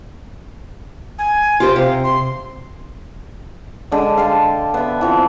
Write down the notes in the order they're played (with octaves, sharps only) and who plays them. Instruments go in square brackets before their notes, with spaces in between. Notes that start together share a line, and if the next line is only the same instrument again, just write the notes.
[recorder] G#5
[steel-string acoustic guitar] F4 G4 C5
[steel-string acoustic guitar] C3 [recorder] F5
[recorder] C6
[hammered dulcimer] D3 G#3
F5 G5 A5 C6
B3 E5
E3 F3 C4